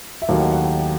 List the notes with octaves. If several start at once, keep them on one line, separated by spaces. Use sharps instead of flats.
E5
D#2 D#3 F#3 A3 F5
F#5
F#5
G5